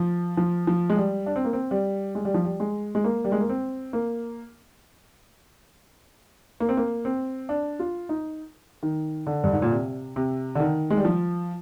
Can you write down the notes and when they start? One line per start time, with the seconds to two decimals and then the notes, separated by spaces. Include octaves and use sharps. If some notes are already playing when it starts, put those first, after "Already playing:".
Already playing: F3
0.37 F3
0.67 F3
0.90 G#3
0.97 G3
1.26 D4
1.36 C4
1.45 A#3
1.53 C4
1.71 G3
2.15 G#3
2.25 G3
2.34 F3
2.45 G3
2.60 G#3
2.95 G#3
3.04 A#3
3.25 G3
3.32 G#3
3.40 A#3
3.49 C4
3.93 A#3
6.60 A#3
6.69 C4
6.77 A#3
7.05 C4
7.49 D4
7.79 F4
8.09 D#4
8.83 D#3
9.27 D3
9.44 G2
9.53 G#2
9.62 A#2
9.72 C3
10.16 C3
10.55 D3
10.60 D#3
10.90 G#3
10.97 G3
11.05 F3